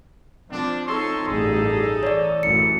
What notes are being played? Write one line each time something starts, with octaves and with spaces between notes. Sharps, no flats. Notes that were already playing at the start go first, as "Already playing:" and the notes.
F3 C4 D4
D#4 A4 C#5 C6
A1 G2 G#4
E3 C#5 D5
A1 F#2 E3 C#7